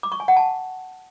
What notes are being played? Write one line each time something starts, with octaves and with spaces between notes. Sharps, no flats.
D6
C#6
G#5
F#5
A5